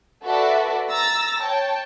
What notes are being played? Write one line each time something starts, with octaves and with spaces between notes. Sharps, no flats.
F#4 A4 B4 D5 E5
A#5 E6 A6 A#6
C#5 G5 A5